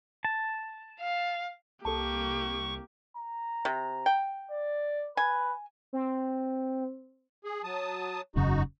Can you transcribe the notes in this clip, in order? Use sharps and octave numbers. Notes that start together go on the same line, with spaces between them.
A5
F5
C2 A#3 G4 A4 A5 C#6
A#5
C3
G5
D5
B4 G#5
C4
G#4
F#3 A5 D#6
E1 F#2 C#3 D#4 F#4